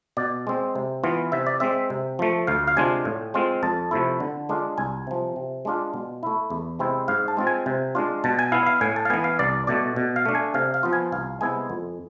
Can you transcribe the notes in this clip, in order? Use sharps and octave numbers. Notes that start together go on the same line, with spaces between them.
B2 D5
G#3 C4
C3
E3 B3 F4
C3 E5
D5
G#3 C4 E5
C3
F3 A3
D2 F5
F5
C3 G#3 D4 F4 G#5
A2
G#3 C4 F4
F2 A5
C3 F3 A3 E4
D3
G#3 D4 F4
C2 G#5
C3 F3
C3
G#3 D4 F4
B2
A3 E4
E2
C3 G#3 C4 E4
G#2 F5
A5
G#3 C4 F4
G#5
C3
G#3 D4 F4
B2 A5
G#5
B3 E4 F5
F5
A2 G#5
A5
F5
E3 B3 G#5
F5
C2 D5
B2 A3 D5
B2
F5
A3 D4
G#5
C3 F5
F5
F3 B3 F4
G#5
C2 F5
C3 G#3 B3 E4 G#5
F2